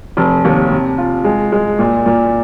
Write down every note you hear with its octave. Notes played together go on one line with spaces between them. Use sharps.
F1
D#2
C3
F4
G#3
G#3
A#2
A#2